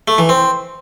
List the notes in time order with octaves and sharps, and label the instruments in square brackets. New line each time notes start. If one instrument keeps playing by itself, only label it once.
[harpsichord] A3
E3
C4